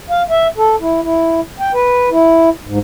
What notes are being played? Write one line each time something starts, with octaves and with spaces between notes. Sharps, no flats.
F5
E5
A4
E4
E4
G5
B4
E4
G#2